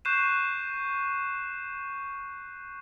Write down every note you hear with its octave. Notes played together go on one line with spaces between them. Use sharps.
C#6 F#6 G6 C7 D#7 E7